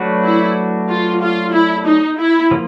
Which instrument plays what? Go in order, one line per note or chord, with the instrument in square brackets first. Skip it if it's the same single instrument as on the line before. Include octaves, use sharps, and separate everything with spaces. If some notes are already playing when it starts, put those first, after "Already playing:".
Already playing: [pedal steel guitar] F#3 A3 D4 F#4 B4
[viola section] E4
F4
F4
E4
D#4
E4
[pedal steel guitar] F3 A#3